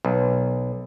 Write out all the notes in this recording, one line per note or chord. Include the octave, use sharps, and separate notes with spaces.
B1